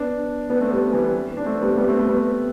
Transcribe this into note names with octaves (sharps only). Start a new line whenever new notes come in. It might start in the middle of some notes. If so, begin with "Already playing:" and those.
Already playing: B3 D4
B3 D4
A3 C4
G3 B3
E3 G3
G3 B3
D4
A3 C4
G3 B3
G3 B3
A3 C4
A3 C4
G3 B3